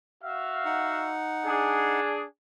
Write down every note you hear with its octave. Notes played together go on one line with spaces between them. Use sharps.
F#4 E5 F5
D#4 F#5
D4 G#4